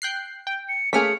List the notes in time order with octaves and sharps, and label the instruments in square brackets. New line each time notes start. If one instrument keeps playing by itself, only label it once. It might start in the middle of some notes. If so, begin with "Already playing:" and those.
[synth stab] G5 F#6 C7
G5
[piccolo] C#7
[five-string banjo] A3 C#4 G#4 [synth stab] A#3 F6 B6 [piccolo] C#7